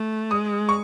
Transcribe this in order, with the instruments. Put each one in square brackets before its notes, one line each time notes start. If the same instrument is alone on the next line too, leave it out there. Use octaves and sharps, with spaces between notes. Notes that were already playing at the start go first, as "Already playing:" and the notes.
Already playing: [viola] A3
[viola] G#3 [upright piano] D#6
[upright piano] C#6